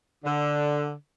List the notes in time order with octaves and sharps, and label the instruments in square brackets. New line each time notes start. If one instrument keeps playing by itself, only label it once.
[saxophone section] D3